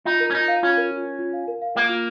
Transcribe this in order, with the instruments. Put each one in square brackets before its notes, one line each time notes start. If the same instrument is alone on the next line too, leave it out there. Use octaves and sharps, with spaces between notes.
[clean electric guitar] D#4 [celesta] F4
[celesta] A#4
[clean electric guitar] C#4
[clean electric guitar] D#4 [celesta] F4
[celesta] F5
[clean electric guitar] C#4 [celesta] F4
[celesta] A#4
F4
F4
F4
F5
A#4
F5
[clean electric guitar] A#3 [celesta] F4
[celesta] F4